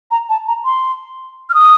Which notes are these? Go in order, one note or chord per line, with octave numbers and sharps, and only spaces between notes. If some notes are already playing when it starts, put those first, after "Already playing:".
A#5
A5
A#5
C6
F6
D#6